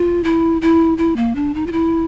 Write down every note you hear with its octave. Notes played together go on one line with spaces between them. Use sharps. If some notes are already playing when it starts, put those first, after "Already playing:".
Already playing: F4
E4
E4
E4
A#3
D4
D#4
F4
E4